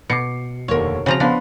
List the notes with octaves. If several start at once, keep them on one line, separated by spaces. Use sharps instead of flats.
B2 D6 C7 C#7
F1 D#2 D3 A#4 C#5
C#3 F3 C4 F#4 A#5
F3 B3 D4 F5 B5